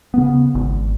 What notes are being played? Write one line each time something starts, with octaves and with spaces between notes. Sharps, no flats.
C#3 B3
G#1